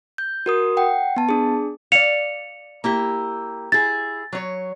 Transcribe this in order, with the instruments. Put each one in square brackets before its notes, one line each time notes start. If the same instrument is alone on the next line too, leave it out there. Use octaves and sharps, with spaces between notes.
[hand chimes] G6
F#4 A#4 D#6
F#5 G5
B3 A5
D4 G#4
[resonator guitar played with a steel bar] D5 F5 [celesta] C#7 F7
[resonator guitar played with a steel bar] A#3 E4 G4
[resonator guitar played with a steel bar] E4 G#4 [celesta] A6
[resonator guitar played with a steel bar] F#3 C#5